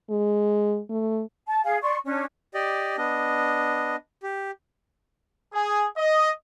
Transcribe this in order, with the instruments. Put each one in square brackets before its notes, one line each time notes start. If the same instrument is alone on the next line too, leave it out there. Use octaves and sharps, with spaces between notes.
[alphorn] G#3
A3
[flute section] A5
G#4 F5 G#5
D5 C6 C#6
C#4 D4
[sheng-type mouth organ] G4 D5 D#5
B3 D4 D#5
G4
[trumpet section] G#4
D#5